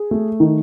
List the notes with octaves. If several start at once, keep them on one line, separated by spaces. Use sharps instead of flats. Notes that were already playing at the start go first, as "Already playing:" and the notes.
Already playing: G#4
A3
D#3